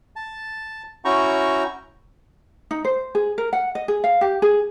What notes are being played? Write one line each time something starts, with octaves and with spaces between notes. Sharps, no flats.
A5
C#4 E4 F#4 G5 A#5 C#6
D#4
C5
G#4
A#4
F#5
D#5
G#4
F5
G4
G#4